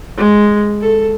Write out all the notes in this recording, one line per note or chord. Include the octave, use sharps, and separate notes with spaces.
G#3
A4